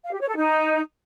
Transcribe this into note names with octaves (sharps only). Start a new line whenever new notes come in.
F5
G4
C#5
A4
D#4